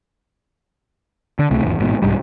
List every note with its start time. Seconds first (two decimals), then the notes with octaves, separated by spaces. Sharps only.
1.39 D3
1.50 C#2 C3 A3
1.63 G#1 E2
1.79 A1 G#2 B2
2.02 C2 G#2 G3